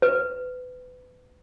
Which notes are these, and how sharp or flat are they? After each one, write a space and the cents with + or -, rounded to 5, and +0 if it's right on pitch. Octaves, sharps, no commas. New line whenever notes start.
B4 +30